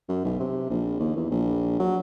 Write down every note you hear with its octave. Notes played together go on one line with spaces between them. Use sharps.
F#2
B1
C3
A#1
D#2
E2
A#1
F#3